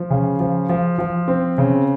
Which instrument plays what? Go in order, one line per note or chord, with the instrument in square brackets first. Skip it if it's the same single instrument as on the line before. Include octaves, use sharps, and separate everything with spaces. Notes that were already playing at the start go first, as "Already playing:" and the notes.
Already playing: [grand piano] F3
C#3
F3
F3
F3
C4
C#3